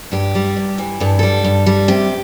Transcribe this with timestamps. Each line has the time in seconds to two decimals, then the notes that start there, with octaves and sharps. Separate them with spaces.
0.12 G2 G4
0.35 G3
0.57 G2
0.78 E3
1.00 G2 A4
1.19 G3 A4
1.44 G2
1.66 G3
1.88 C3 G4